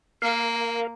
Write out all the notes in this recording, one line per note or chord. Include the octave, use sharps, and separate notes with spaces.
A#3 A#4 F5